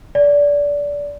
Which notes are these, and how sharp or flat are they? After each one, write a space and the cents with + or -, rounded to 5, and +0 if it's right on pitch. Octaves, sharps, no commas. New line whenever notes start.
D5 -20